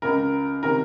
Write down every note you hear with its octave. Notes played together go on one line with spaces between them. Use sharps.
C#2 C#3 A#4
C3 D#3 A#4